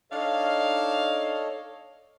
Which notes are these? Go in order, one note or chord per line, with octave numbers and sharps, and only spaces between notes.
D4 D#4 A4 C#5 D#5 F5